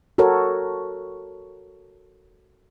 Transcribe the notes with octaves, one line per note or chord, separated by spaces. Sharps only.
F#4 A4 A#4 C#5